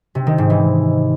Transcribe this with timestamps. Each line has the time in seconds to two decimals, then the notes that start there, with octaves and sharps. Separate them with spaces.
0.15 C3
0.27 D#3
0.38 G#2
0.50 E3